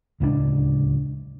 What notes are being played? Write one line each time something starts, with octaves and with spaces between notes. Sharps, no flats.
D1 C#2 D#3 D4